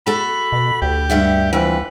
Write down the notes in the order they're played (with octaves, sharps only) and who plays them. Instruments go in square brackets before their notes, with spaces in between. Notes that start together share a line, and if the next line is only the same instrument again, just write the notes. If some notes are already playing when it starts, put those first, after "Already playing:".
[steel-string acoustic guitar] F#4 A4 [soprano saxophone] B5
[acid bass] B2
[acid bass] D2 [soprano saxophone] G4
[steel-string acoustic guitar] G2 E5 F#5
[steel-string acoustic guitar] F2 E3 F#5 [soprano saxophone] B4